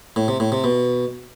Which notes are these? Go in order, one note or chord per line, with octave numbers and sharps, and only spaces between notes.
A2
C3
A2
C3
B2